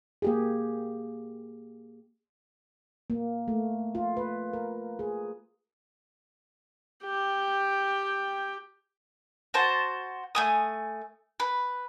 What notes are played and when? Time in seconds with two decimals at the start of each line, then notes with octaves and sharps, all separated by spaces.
0.22 A#3 G4 G#4
3.10 A#3
3.48 A3
3.95 F4
4.17 B4
4.53 A#4
4.99 G#4
7.04 G4 G5
9.54 F#4 C5 A5
10.35 A3 G#5 D#6
11.40 B4